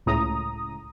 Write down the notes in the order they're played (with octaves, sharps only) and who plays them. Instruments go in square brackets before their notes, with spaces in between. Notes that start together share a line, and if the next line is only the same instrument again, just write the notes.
[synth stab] C#2 A2 A#5 D#6